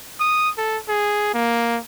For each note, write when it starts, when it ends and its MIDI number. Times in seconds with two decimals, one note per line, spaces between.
0.20 0.50 87
0.58 0.77 69
0.89 1.29 68
1.34 1.78 58